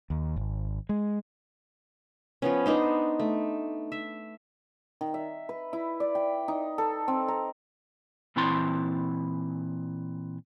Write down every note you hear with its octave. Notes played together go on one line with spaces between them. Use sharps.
D#2
G#1
G#3
F3 B3 C#4
B3 D4 D#4 C5
A3
E5
D#3
E5
B4
E4
D5
G5
D#4
A4
C4
A#5
A#2 E3 C4 E4 A5 C6